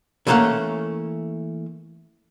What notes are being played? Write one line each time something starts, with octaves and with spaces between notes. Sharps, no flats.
D3 E3 A3 A#3 C#4 F#5